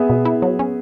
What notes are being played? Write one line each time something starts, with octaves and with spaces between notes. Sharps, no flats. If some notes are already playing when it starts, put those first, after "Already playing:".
Already playing: B3 G#4 E5
B2
E4
F#3
C#4